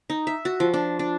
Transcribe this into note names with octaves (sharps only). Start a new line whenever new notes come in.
D#4
E5
F#4
F3
D4
D4